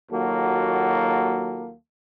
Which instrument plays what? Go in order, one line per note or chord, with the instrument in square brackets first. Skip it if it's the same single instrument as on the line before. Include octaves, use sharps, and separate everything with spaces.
[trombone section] D#2 F#3 A#3 F4 F#4 A4